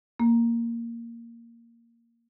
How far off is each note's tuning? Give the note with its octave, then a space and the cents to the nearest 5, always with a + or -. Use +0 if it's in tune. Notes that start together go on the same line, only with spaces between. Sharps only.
A#3 -5